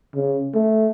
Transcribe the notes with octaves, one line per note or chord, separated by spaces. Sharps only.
C#3
A3